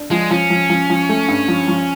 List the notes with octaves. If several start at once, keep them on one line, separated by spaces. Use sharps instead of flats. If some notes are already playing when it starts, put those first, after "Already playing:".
Already playing: D4
F3 G#3
F3 C#4
F3
F3
F3
A3
G2
F3
F3